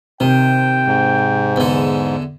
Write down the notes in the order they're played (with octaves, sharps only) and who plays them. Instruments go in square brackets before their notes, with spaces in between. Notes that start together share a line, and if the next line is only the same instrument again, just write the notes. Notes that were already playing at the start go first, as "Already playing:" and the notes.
[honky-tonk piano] C3 [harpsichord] D#3 [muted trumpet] G5
[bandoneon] G#2
[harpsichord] E2 D3